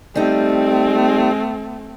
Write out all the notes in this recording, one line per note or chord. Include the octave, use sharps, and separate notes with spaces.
G3 A3 C4 D#4